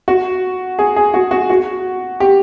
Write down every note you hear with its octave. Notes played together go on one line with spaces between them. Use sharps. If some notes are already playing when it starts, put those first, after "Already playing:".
F#4
G#4
G#4
F#4
F#4
F#4
G4